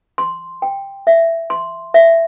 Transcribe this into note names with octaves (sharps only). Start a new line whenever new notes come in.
C6
G5
E5
C6
E5